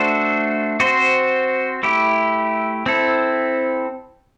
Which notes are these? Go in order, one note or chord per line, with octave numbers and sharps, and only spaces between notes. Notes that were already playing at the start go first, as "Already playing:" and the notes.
Already playing: A3 D4 F#4 A4 C5
C4 F#4 C5
A3 E4 G4
C4 E4 A4